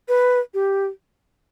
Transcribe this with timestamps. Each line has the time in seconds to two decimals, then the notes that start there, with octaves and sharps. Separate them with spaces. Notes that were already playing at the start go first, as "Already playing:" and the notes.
0.08 B4
0.54 G4